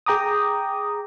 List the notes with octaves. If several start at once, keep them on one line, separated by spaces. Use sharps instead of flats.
G#4 G5 A#5 D6 D#6